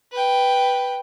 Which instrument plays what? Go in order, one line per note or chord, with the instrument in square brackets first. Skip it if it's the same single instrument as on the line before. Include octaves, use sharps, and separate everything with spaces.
[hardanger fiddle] B4 G5